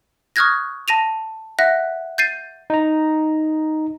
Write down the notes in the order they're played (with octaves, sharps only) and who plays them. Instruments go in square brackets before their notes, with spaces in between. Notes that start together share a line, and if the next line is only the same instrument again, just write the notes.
[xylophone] C#6 D#6 F6 F#6 G#6 A#6
A5 A#6 D#7 F7
E5 F#5 F#6 A#6
G6 A6 C7 D#7
[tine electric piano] D#4 A#5